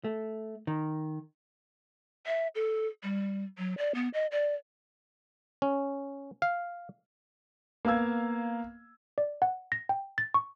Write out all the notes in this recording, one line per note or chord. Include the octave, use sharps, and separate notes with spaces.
A3
D#3
E5
A4
G3
F#3
D5
B3
D#5
D5
C#4
F5
A#3 B3 F5 E6 G#6
D5
F#5
A#6
G5
A6
C#6